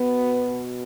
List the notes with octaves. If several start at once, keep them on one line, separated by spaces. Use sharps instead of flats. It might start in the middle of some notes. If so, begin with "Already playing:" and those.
Already playing: B2 B3